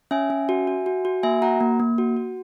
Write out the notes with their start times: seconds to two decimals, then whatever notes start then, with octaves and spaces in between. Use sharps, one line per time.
0.11 C#4 E5 G#5
0.30 C#4
0.49 F#4
0.67 F#4
0.86 F#4
1.05 F#4
1.23 A#3 E5 G#5
1.42 F#4 F#5 A#5
1.60 A#3
1.80 A#3
1.98 F#4
2.17 F#4